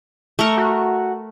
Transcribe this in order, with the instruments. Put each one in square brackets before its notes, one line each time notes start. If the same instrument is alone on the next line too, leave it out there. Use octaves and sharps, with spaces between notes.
[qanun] A3 A#4 [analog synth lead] C#6
[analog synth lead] F#4